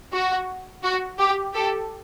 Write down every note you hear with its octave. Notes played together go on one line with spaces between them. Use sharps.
F#4
F#4
G4
G4 A4